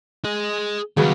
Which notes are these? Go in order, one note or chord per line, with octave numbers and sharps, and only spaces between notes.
G#4 D#5
D#2 C#3 F#3 G3 B4